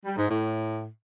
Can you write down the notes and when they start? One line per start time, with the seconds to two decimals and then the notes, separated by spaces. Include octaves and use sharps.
0.05 G3
0.17 G#2
0.29 A2